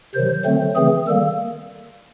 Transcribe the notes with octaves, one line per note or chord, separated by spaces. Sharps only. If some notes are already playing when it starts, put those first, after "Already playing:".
C3 D#3 F#3 C5
D3 F#3 A3 C4
C#3 E3 A3 C4 G#4
D#3 G3 A#3 A4